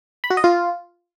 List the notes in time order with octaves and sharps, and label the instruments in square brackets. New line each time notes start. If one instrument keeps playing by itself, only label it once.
[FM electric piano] B5
F#4
D#5
F4